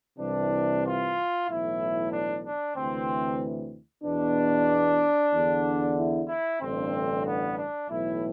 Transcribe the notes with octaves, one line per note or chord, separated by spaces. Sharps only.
C2 C3 E3 D4
F4
B1 A2 E3 E4
D4
D4
D2 C3 E3 C4
E2 B2 D4
E2 D3
E4
E4
A1 G2 D3 C4
B3
D4
B1 A2 E3 E4